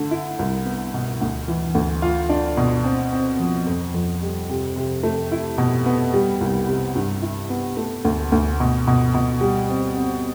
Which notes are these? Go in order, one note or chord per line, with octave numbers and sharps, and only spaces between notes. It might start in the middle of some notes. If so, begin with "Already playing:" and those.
Already playing: D3 A3
E4
C2
B3
B2
D2
E3
D2
F4
D4
B2
C4
C4
F3
F2
F2
G3
C3
C3
A3
E4
B2
B3
G3
C2
C3
G2
E4
B3
A3
D2
D2
B2
B2
B2
G3
C4
C4